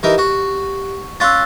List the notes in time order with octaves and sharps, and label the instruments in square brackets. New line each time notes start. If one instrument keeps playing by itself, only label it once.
[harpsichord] E3 D#4 A#4 [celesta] G4
[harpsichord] F#4
[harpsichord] C#4 F4 [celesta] E6 F#6 A6